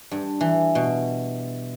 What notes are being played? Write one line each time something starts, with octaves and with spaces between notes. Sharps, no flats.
G2
E3
B2